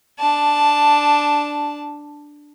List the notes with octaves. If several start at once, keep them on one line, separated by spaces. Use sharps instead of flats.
D4 A5